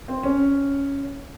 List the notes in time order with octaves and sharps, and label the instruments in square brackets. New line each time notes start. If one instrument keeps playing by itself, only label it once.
[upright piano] C4
C#4